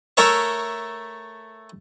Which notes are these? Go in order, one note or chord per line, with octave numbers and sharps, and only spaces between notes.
A3 A4 A#4 C#5 E5